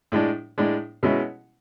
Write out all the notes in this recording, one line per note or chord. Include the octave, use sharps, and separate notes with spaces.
A2 G#3 D4
A2 G#3 D4
B2 G#3 C#4 E4